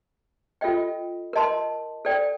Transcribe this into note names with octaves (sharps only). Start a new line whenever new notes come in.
F4 A4 D#5 G5
A#4 D#5 A5 C6
A4 D5 G5